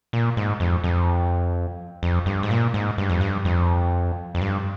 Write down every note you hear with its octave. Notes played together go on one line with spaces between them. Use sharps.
A#2
G#2
F2
F2
F2
G2
G#2
A#2
G#2
G2
F2
G2
F2
F2
G2